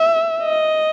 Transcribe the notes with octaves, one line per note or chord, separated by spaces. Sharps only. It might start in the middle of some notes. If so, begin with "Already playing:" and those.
Already playing: E5
D#5